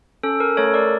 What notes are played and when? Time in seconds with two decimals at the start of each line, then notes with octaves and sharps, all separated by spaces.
0.23 C#4 A4
0.40 A#4
0.57 A3 A4 C#5
0.74 A#4 D5